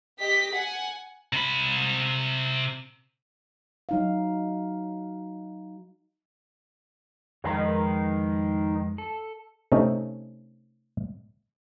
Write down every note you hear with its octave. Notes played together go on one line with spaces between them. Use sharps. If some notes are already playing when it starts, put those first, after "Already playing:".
G4 D#5 B6
F#5 G#5
C3 B5
F#3 D#4 F5
F2 D#3 G#3 B4
A4
C3 A3 C#4 D#4